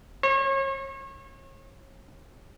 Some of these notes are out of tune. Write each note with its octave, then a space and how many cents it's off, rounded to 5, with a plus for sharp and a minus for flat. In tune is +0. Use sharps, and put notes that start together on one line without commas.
C#5 -35